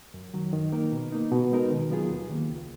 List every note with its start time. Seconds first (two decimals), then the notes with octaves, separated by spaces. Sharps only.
0.14 F#2
0.34 D#3 F#3
0.53 D#3
0.72 A#3 D#4 A#4
0.92 B2
1.12 A#3 D#4
1.31 B2
1.51 G#3 D#4 A#4
1.71 D#3
1.90 F#3 B3 F4 G#4
2.10 D#2
2.30 D#3 A#3
2.49 C#2